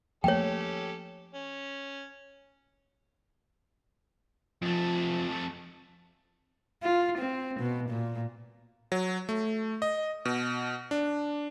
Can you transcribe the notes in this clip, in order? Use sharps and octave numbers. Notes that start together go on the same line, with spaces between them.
F3 A3 A#3 C#4 G4 A4 C#5 G5
C#4
F2 F3 A3
F4
C4
B2
A#2
F#3
A3
D#5
B2
D4